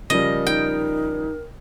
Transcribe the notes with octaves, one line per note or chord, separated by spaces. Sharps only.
C#3 F3 G3 A#4 D#5
D#4 G5